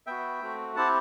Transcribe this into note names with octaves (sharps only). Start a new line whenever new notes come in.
B3 F#4 E5 G5
A3 C4 F#4
C4 E4 G4 F#5 A5